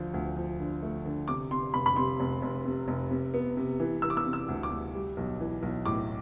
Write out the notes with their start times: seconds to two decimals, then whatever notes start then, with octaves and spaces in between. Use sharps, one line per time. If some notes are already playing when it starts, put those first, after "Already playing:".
Already playing: D2 D3 F3
0.14 D2
0.36 F3
0.60 D3
0.83 A3
1.05 D3
1.28 C3 D6
1.51 C3 C6
1.74 F1 B5
1.86 B5
1.96 C3 C6
2.20 F1
2.42 F1
2.65 C3
2.88 F1
3.11 C3
3.34 B3
3.57 C3
3.80 E3
4.02 E3 E6
4.10 D6
4.17 E6
4.26 C3
4.33 E6
4.48 D2
4.63 D6
4.71 D2
4.94 G3
5.17 B1
5.40 E3
5.63 B1
5.86 A2 D6